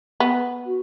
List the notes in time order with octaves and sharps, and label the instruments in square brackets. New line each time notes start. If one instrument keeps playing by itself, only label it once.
[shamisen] B3
[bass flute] F#4